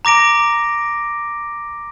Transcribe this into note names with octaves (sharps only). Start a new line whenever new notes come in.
A#5 D6 A#6 D7